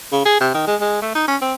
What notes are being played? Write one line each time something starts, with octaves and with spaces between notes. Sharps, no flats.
C#3
G#4
C3
D#3
G#3
G#3
A3
D#4
C#4
C4